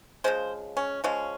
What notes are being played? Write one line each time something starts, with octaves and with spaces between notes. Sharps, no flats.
C#3 F3 G#3 C5
C#4
C#3 F3 G#3 C#4